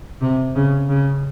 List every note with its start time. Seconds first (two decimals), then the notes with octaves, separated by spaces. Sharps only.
0.21 C3
0.55 C#3
0.89 C#3